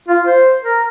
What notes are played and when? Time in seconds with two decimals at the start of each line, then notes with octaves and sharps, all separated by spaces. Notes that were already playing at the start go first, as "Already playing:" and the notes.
0.09 F4
0.27 C5
0.61 A#4